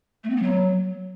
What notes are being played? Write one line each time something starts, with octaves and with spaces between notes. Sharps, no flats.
A3
C4
B3
F#3